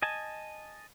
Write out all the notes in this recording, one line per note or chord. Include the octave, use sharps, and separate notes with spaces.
D#5 G#5 A5